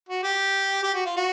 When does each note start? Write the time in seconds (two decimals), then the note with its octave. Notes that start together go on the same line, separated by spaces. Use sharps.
0.09 F#4
0.23 G4
0.83 G4
0.95 F#4
1.06 F4
1.16 F#4